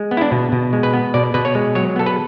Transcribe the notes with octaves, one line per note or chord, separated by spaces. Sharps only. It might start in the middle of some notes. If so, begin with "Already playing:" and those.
Already playing: G#3
B3
E4
D4
B2
B2
G#3
B4
B3
B2 D5
B2 B4
C#5
G#3
F#3 C#5
B3 A4
B4